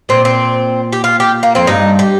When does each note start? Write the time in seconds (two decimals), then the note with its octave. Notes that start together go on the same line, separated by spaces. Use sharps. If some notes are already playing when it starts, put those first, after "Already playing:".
0.09 A#2 C4
0.25 C4
0.93 G4
1.04 F4
1.20 G4
1.43 A#3
1.55 F2 C4
1.67 G2 D#4
1.99 G4